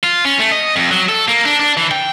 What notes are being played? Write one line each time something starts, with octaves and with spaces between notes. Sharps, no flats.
F4
C#4
A3
D#5
F2
F#3
A4
A#3
D4
D4
E3
G5